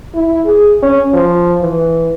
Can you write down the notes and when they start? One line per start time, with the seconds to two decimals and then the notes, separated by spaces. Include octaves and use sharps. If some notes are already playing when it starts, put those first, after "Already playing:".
0.15 E4
0.46 G#4
0.82 C#4
1.13 F3
1.62 E3